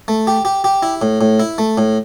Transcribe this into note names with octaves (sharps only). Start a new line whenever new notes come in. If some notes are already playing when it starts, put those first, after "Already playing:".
A3
G4
G4
G4
E4
A2
A2
E4
A3
A2